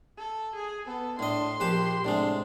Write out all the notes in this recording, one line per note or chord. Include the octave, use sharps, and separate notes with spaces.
A4
G#4
B3 A4
A2 D4 D#5 C6
A#1 G4 B4 A5
A2 C3 G#3 D4